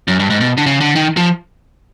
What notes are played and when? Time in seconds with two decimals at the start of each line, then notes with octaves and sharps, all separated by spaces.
0.08 F#2
0.19 G2
0.30 G#2
0.41 B2
0.57 D3
0.66 C#3
0.81 D3
0.95 D#3
1.17 F3